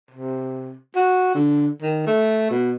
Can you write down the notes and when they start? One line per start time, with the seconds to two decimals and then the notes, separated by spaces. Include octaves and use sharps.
0.11 C3
0.96 F#4
1.35 D3
1.82 D#3
2.07 A3
2.50 B2